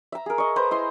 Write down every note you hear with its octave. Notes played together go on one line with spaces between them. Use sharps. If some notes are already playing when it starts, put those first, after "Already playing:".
E5 A#5
G#4 A#4
D#5 C#6
B4 C5 A#5
E4 D#5 C6